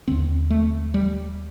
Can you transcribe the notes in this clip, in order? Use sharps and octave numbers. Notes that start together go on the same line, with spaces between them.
D#2 D3 C4
A3
G3